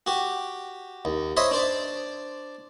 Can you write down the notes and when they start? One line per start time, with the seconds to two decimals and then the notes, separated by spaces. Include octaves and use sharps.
0.06 F#4 G4
1.05 D#2
1.37 C5 C#5 D#5 E5 B5 C6
1.51 D4 C5 D5